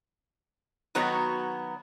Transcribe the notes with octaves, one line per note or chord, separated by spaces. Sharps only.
D#3 F#3 B3 F#4 C#5 A#5